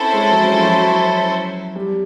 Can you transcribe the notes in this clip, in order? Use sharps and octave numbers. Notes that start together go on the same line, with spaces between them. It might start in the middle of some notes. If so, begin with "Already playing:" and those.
Already playing: C4 C#4 E4 A4 C5
G#3
F#3
F3
F3
F#3
G3